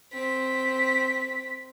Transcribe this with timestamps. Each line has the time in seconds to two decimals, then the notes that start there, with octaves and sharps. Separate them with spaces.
0.13 C4 B6